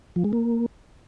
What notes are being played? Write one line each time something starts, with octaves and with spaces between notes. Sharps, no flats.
F3
G#3
A#3